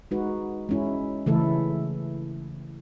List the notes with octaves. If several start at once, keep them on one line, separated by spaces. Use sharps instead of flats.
G#3 D#4 F#4 B4
G#3 C#4 E4
C#3 E3 A3 E4 A4